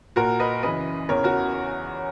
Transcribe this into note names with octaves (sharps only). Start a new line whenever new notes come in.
A#2 F#4 A#4
B4 D#5
F#2 C#3 E3 B4 D#5
E2 C#3 E3 A#4 C#5
F#4 A#4